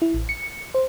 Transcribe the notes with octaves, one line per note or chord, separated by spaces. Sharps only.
E4
A1
C#7
C5